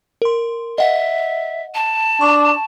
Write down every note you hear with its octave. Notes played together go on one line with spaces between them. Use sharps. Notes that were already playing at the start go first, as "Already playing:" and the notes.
A#4 C6
D#5 E5 F#5
A5
D4 C#6